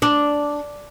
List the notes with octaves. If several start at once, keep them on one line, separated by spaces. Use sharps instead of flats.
D4